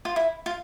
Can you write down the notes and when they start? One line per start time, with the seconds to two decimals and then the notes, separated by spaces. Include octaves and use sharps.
0.05 F4
0.16 E4
0.46 F4